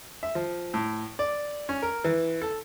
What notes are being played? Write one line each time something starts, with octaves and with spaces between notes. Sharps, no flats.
E5
F3
A2
D5
C#4
A#4
E3
A4